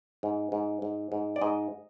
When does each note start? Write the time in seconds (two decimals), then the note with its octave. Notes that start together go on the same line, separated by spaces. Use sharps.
0.23 G#2
0.52 G#2
0.82 G#2
1.12 G#2
1.36 D5
1.41 G#2 D#5